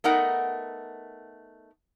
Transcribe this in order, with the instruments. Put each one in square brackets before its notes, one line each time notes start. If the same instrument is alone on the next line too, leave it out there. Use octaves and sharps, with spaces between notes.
[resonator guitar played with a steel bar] A3 B3 D#4 A#4 F#5